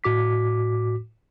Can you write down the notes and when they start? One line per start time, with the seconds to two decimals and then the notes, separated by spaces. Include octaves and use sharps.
0.04 A2 F#4 D6 B6